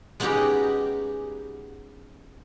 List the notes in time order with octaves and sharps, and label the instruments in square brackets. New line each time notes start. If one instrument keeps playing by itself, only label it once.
[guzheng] G#3 B3 C#4 D#4 F#4 G4